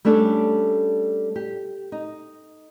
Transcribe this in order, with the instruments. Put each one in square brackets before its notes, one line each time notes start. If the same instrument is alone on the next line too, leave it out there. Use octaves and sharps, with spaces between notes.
[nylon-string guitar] G3 A3 C#4 D4 A4
G4
D#4